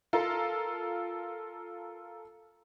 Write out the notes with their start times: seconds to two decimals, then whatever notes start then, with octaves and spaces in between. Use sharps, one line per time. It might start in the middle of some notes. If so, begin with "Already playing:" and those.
0.13 F4 A4 A#4